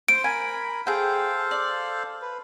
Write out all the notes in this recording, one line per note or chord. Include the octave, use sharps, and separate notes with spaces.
C5 D7
A#4 G#5 B5
G#4 A4 C5 F5 G5
D5
B4